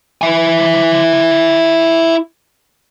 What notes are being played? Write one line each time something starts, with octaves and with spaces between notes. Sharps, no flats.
E4 G#5